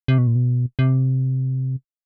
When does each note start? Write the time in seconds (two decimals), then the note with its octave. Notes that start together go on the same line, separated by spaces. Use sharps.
0.08 C3
0.18 B2
0.27 A#2
0.35 B2
0.79 C3